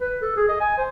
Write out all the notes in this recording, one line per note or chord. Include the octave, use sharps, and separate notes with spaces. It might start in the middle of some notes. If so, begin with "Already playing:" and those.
B4
A4
G#4
D#5
G#5
C5